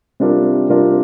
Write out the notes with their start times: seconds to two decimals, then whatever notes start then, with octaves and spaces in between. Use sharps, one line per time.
0.20 C3 G3 D4 F4 A#4
0.69 C3 G3 D4 F4 A#4